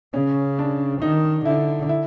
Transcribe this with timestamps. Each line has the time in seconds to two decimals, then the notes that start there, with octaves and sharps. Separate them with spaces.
0.14 C#3 C#4
0.59 D4
1.02 D#3 D#4
1.45 D3 E4
1.89 E4